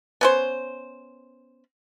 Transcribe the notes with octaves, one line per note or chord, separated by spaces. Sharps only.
B3 C#4 C5